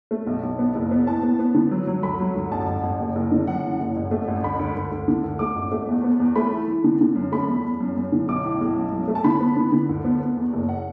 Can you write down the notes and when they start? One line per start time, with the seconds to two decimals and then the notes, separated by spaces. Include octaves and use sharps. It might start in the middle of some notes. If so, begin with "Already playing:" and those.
0.11 A3
0.27 B1
0.43 B1
0.59 B3
0.75 F#1
0.91 B3
1.07 A2 A5
1.23 B3
1.39 B3
1.54 D3
1.71 F#3
1.87 F#3
2.03 D2 B5
2.20 F#3
2.36 D2
2.51 A1 A5
2.67 A1
2.83 A1
3.00 F#1
3.15 F#1
3.32 D3
3.47 F#2 F#5
3.63 E3
3.79 F#1
3.96 A1
4.11 A3
4.28 A1
4.43 D2 B5
4.59 D2
4.76 D2
4.92 D2
5.08 D3
5.24 D2
5.39 A3 D6
5.56 A1
5.72 A3
5.88 E2
6.04 B3
6.20 E2
6.36 A3 B5
6.52 E3
6.68 E3
6.84 D3
7.01 D3
7.16 F#2
7.32 A3 B5
7.48 E2
7.64 E2
7.80 F#2
7.96 F#2
8.12 D3
8.28 B1 D6
8.44 A2
8.61 B1
8.76 F#2
8.92 F#3
9.08 A3
9.15 A5
9.24 D3 B5
9.40 B3
9.56 D3
9.72 D3
9.89 D2
10.05 B3
10.21 B3
10.37 E2
10.53 F#1
10.69 F#5